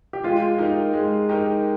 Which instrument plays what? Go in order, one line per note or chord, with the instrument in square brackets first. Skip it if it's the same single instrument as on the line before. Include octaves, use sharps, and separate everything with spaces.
[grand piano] G4
[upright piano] G#3 [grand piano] F4
[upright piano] D#4 G4 A#4
G#3
D#4 G4 A#4